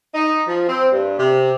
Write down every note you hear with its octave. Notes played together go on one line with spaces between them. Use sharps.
D#4
F3
C4
G2
C3